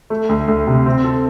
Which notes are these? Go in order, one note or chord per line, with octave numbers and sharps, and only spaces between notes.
A3
D2
D2
C3
C4
A4